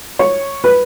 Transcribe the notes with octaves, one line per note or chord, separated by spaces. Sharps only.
C#5
B4